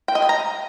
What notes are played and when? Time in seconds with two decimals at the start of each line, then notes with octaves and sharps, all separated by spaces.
0.08 G5
0.15 D#5
0.22 G#5
0.29 A#5